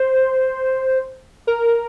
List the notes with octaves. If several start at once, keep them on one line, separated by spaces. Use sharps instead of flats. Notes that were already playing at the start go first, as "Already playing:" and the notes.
Already playing: C5
A#4